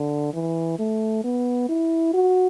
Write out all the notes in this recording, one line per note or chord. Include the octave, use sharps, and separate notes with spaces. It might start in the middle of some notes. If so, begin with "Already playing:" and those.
Already playing: D3
E3
A3
B3
E4
F#4